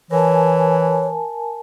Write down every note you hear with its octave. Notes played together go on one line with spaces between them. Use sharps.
E3 A#4 C#5 G#5 A5